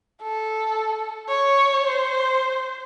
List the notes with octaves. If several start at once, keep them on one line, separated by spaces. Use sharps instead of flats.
A4
C#5
C5